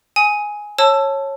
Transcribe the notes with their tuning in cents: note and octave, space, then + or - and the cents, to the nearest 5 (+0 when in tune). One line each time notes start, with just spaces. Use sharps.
G#5 +0 D#6 +30
C#5 -15 A5 +0 E6 +15